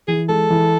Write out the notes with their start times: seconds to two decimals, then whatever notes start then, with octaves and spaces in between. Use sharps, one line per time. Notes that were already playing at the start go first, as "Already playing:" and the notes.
0.08 E3 G#4
0.29 G#3 A4
0.50 E3